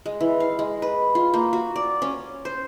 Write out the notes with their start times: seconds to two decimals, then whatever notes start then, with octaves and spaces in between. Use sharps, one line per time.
0.06 G#3
0.21 E3
0.40 F5
0.59 G#3
0.82 B4
1.15 F4
1.34 A#3
1.53 F#4
1.76 D5
2.02 C#4
2.45 C5